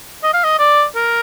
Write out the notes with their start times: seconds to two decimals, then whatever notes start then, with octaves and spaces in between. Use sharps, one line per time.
0.24 D#5
0.34 F5
0.44 D#5
0.59 D5
0.96 A#4